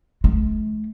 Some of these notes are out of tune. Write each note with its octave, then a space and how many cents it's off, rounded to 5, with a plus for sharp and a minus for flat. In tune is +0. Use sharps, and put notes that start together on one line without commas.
A3 -45